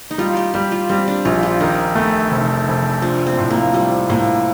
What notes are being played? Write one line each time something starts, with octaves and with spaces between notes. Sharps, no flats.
D#4
G3 F4
G4
G3 G4
F4
G3 C4
D4
A#1 F4
F4
D#3 D#4
A3
F1
F1
F3 D4
C4
A2
A#3
F3 G3
A2 A#3